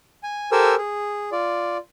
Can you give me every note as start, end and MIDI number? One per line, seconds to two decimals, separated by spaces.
0.23 0.50 80
0.52 0.75 67
0.52 0.75 69
0.52 0.75 70
0.52 0.75 72
0.52 0.75 80
0.52 0.75 88
0.78 1.30 68
1.32 1.77 65
1.32 1.77 74